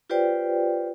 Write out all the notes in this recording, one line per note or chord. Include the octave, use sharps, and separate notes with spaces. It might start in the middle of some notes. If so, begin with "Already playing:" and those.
F4 G4 B4 C5 D5 G5